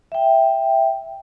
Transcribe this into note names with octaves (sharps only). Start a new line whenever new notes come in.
E5 G5